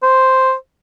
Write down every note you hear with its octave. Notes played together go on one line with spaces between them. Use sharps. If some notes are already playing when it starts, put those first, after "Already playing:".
C5